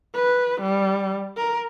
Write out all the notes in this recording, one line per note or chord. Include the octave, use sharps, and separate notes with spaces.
B4
G3
A#4